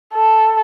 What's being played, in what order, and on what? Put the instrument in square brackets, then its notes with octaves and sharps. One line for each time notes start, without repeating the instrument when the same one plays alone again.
[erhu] A4